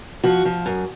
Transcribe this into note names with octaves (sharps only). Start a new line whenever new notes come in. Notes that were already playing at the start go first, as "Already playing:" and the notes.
F3 F#4
F3
F#2